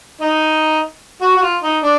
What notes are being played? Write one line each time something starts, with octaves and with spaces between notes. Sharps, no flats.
D#4
F#4
F#4
F4
D#4
D4